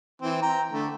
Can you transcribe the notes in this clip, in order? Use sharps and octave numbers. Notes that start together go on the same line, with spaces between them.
E3 C4
G5 A#5
D3 A3